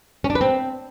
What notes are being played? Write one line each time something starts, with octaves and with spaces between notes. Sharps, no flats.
C#4
D4
B4
C4